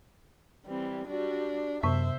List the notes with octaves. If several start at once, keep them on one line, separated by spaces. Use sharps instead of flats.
E3 G3 C4
G3 D4 F#4
F#2 C3 B3 C5 E5